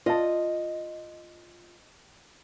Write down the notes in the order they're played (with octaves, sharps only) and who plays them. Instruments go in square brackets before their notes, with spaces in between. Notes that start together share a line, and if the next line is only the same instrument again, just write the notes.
[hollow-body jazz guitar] F4 A5 [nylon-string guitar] D#5